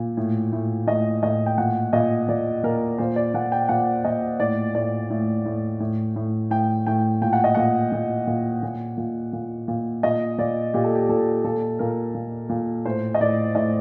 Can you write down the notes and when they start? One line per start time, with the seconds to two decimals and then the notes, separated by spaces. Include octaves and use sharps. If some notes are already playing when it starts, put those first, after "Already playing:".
Already playing: A#2
0.17 A2
0.52 A2
0.87 A2 D#5
1.23 A2 D#5
1.46 G5
1.58 A#2 F#5
1.93 A#2 D#5
2.28 A#2 D5
2.63 A#2 A#4
2.98 A#2 C5
3.16 D5
3.34 A#2 F#5
3.52 G5
3.69 A#2 F#5
4.05 A#2 D#5
4.40 A2 D5
4.75 A2 D5
5.10 A2
5.45 A2
5.80 A2
6.16 A2
6.50 A2 G5
6.86 A2 G5
7.21 A#2 G5
7.33 F#5
7.44 D#5
7.55 A#2 F#5
7.92 A#2
8.27 A#2
8.63 A#2
8.97 A#2
9.33 A#2
9.68 A#2
10.03 A#2 D#5
10.38 A#2 D5
10.74 A#2 G4
10.84 A4
10.95 G4
11.09 A#2 A4
11.44 A#2 A4
11.79 A#2 A#4
12.15 A#2
12.49 A#2
12.85 A2 C5
13.14 D#5
13.21 A2 D5
13.55 A2 D#5